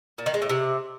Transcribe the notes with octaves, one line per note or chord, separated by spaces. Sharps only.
A#2
D#3
G#3
A2
C3